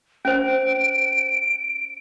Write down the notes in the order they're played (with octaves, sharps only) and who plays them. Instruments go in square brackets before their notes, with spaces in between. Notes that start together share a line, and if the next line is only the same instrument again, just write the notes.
[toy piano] C#4 C5 [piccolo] D7